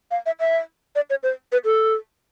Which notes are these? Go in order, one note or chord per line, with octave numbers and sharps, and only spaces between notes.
F5
E5
E5
D5
C#5
C5
B4
A4